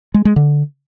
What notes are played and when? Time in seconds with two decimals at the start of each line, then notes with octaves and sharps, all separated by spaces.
0.14 G#3
0.25 G#3
0.36 D3